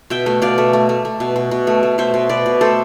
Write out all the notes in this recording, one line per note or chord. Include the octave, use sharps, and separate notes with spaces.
B2 E5 G5
A3
B2 D5 F5
A3
A3
A3
A3
B2
B2
B2
A3
A3
B2 C5 E5
B2
B2 B4 D5
B2
A3 A4 C5